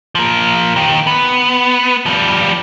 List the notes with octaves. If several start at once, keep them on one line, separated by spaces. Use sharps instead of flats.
F3 A#3
D#3 G4
B3
F3 G3